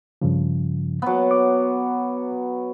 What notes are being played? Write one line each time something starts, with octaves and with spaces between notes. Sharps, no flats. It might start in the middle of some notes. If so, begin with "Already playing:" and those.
G2 C#3 F3
F#3 B3
D6